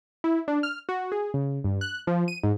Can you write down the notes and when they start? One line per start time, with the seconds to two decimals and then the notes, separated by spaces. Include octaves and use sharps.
0.24 E4
0.48 D4
0.63 F6
0.89 F#4
1.12 G#4
1.34 C#3
1.64 G2
1.81 F#6
2.07 F3
2.28 D#7
2.43 G#2